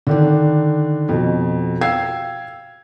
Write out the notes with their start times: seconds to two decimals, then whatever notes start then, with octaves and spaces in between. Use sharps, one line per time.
0.07 D3 D#3 D4
1.09 F2 B2
1.81 F5 G5 E6 G#6 C7